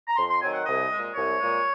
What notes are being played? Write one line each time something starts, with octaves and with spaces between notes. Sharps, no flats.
A#5
F2 C6
C6
D#3 F#3 C4 G#5
F#5
C2 D#5
A#2 G#3
C2 C#5
A#2 G#3